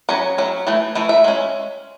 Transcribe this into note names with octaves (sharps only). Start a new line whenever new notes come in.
F#3 C#4 C#5
F#3 C#4
E3 A3
E3 A3
E5
G#3 C#4